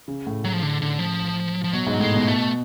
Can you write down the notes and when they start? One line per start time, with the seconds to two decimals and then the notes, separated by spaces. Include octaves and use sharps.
0.08 C#3
0.27 A2
0.44 A2 F#3
0.53 F3
0.63 D3
0.82 D3
0.99 F3
1.64 F3
1.73 B2 F#3
1.87 G#2
2.00 A2 G#3
2.14 B2
2.27 A3